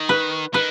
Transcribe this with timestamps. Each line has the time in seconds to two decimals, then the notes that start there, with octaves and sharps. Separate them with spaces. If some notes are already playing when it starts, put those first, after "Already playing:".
Already playing: D#3
0.09 B4
0.53 D#3 B4